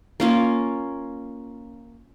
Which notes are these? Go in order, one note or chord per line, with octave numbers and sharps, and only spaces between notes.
A#3 C#4 F4